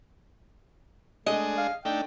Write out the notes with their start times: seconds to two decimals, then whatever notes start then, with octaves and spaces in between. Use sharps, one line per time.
1.26 G#3 A3 D4 G#4 D#5
1.58 F5
1.85 A3 D4 D#4 G5